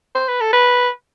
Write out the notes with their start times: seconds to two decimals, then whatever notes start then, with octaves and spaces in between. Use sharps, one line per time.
0.15 C5
0.28 B4
0.41 A4
0.53 B4